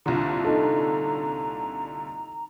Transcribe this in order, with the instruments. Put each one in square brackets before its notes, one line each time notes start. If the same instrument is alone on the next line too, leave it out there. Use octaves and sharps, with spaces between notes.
[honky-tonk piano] C2 A#2 D3 [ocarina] A#5
[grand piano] D#4 A4